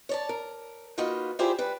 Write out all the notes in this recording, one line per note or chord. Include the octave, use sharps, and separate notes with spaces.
C#5 D5 A5
A#4
A#3 D#4 F4 F#4 B4
E4 F4 G4 G#4 C5 D5
G3 B4